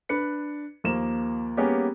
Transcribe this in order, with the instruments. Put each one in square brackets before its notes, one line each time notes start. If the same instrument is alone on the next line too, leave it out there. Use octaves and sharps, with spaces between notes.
[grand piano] D4 B4 C#7
D#2 F3 A#3 E7
G3 A#3 B3 C#4 G4 G#4